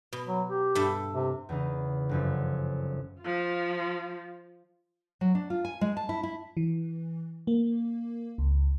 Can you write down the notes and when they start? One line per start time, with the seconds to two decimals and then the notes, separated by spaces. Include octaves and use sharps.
0.13 B2
0.27 F#3
0.50 G4
0.75 G2 A4 E5
1.14 C3
1.49 E2 C#3 D#4
2.09 G1 F#2 F3
3.21 F3 F4
5.21 F#3
5.35 D4
5.50 F4
5.65 G#5
5.81 G#3
5.97 A5
6.09 E4
6.23 E4
6.57 E3
7.47 A#3
8.38 C#2